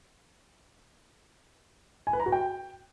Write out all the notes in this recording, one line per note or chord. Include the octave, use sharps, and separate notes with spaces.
G#5
B4
A#5
F#4
G5